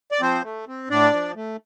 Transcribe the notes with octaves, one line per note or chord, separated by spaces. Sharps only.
D5
F3 C4 C5
A3
C4
A2 D4 D5
F3
A3